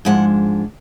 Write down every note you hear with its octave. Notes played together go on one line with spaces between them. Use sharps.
G#2 F3 G#3 D4 F#5